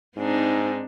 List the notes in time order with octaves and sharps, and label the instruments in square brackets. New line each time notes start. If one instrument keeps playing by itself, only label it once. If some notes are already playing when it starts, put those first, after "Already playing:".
[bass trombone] G#2 [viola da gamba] C4 D4 D#4